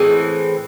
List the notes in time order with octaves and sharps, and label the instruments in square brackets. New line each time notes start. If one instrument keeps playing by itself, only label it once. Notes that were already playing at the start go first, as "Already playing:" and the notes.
Already playing: [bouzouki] A2 E3 G#3 C4